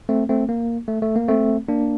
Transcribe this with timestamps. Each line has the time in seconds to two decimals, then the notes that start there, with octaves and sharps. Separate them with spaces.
0.09 A3 C4
0.29 A3 C4
0.49 A#3
0.88 A3
1.02 A3
1.16 A#3
1.28 A3 C4
1.68 A#3 D4